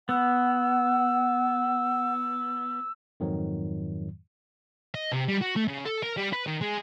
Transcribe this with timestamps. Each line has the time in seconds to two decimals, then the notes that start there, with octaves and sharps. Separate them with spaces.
0.09 B3 F#5 E6
3.20 F2 G#2 D#3 F#3
4.94 D#5
5.12 C3
5.28 G3
5.41 F#4
5.56 A3
5.67 C#3
5.85 A4
6.03 A#4
6.17 G3
6.33 B4
6.47 D#3
6.62 G#3